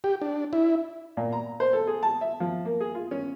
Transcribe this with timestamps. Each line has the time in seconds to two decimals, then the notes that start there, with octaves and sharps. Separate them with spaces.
0.04 G4
0.22 D4
0.53 E4
1.17 A#2
1.32 A#5
1.60 C5
1.73 A4
1.87 G#4
2.03 A5
2.21 E5
2.40 F3
2.65 A#3
2.80 G#4
2.95 F4
3.11 C#4